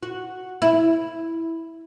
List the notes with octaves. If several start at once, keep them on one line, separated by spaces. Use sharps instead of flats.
F#4
E4